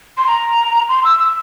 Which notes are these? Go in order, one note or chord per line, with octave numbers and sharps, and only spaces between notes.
C6
A#5
C6
E6
E6